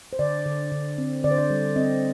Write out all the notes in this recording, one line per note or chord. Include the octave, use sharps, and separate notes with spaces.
C5
D3 D5
D3
D3
C4
D3 D5
C5
D5
G3
C4 D#5